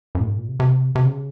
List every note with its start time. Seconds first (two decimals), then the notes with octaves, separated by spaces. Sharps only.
0.15 F#2
0.21 A#2
0.26 G#2
0.38 A#2
0.49 C3
0.60 C3
0.95 C3
1.05 C#3